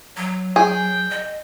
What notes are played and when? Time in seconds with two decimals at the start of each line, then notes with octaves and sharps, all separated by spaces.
0.17 F#3
0.56 G#4 G5
1.10 D#5